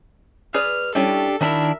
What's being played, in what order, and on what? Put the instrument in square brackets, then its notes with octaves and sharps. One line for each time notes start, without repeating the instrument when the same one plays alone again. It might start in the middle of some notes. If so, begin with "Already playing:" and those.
[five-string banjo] G#4 B4 D5 [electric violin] F6
[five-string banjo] G3 C#4 E4 [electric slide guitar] D4 G4 [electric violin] A4
[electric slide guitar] D#3 D4 E4 [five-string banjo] F#4 B5 [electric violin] A#4 E5